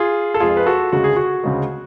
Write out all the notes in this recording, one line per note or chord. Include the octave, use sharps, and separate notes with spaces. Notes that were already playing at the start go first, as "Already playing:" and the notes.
Already playing: F4 G#4
A4
F2 F3 G#3 F4 G#4
B4
F#4 A4
D2 C#3 G#3 F#4
G#4
F#4
D2 C#3 G#3